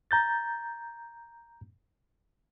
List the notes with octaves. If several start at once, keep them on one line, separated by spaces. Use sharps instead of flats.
A#5 G6 A6